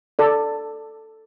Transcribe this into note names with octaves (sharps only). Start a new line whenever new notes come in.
A4 D5